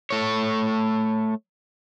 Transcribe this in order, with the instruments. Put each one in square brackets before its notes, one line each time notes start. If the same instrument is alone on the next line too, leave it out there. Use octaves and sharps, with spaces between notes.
[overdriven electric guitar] A3 C#5